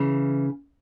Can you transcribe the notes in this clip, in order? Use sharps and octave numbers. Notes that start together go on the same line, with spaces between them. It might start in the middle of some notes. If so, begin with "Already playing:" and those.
Already playing: C#3 E3